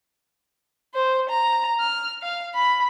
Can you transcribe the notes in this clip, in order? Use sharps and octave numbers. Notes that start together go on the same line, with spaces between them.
C5
A#5
F6
F5
B5